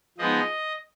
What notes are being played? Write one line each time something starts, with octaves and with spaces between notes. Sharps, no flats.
F3 G#3 B3 D#4 D#5